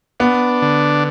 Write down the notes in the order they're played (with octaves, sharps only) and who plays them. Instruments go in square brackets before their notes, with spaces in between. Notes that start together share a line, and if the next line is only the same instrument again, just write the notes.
[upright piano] B3 [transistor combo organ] D4
[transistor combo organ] D3